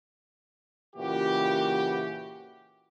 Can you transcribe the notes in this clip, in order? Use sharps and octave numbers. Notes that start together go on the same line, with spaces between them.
A#2 C#3 E3 F#4 G4